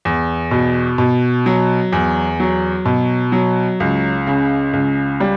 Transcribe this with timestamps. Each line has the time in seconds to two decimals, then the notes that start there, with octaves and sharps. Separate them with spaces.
0.05 E2
0.51 B2
0.98 B2
1.46 F#3
1.92 E2
2.40 F#3
2.85 B2
3.32 F#3
3.80 C#2
4.27 C#3
4.73 C#2
5.20 G3